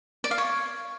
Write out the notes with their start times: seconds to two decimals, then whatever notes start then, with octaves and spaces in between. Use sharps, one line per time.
0.24 D5
0.31 F5
0.38 C#5